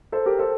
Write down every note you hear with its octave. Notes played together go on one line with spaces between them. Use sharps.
A4 C5
G4 A#4
A4 C5